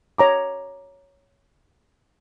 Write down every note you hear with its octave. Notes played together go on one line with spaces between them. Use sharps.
C#5 A#5 D6